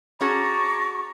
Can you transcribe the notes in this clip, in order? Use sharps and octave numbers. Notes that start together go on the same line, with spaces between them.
C#4 F#4 G#4 D5 A5 A#5 C#6